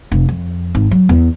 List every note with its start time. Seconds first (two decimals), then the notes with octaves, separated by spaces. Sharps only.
0.12 F1
0.29 F2
0.75 G#1
0.91 F#3
1.09 E2